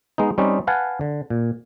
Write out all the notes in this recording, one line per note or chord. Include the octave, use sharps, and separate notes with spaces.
G#3 B3 D#4
G3 C4 C#4 D#4
B4 F5 F#5 G#5 A5
D3
A#2